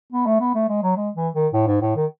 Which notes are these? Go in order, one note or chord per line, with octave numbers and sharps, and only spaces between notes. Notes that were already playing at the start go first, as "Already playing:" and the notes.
B3
A3
B3
A3
G#3
F#3
G#3
E3
D#3
A2
G#2
A2
D#3